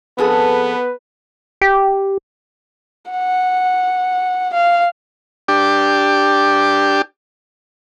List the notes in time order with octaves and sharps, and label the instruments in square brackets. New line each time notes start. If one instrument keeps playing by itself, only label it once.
[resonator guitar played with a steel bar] F2 G#4 A4 [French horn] B3 [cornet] B4
[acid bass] G4
[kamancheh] F#5
F5
[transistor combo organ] D4 G4